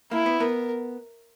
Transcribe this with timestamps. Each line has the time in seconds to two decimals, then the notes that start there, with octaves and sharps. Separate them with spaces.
0.11 A#3 E4
0.26 B3
0.40 B3 A#4